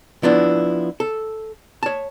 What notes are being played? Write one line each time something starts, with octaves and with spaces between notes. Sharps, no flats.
F3 B3 D4 E4
A4
C#5 A5